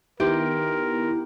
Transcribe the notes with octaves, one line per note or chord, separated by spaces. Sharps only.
D#3 B3 D#4 E4 G4 A#4 C6